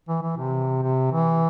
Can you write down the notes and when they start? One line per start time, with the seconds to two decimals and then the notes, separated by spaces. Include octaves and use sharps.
0.09 E3
0.23 E3
0.38 C3
0.82 C3
1.11 E3